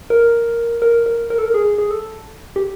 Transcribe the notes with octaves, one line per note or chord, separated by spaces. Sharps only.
A#4
A#4
A#4
A#4
A4
A#4
G#4
G#4
A4
G4